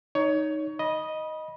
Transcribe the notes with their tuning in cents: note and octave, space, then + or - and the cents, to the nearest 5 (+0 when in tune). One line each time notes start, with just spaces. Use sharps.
D#4 +0 C#5 +20
D#5 +0 B5 -25